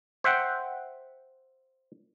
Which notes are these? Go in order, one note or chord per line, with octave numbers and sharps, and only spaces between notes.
C5 E5 F#5 G5